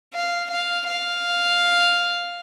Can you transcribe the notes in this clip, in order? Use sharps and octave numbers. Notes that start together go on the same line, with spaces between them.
F5
F5
F5